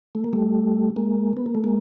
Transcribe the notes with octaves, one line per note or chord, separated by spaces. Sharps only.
A3
A#3
G3 A3
G#3 A#3
B3
A#3
A3
G#3 A#3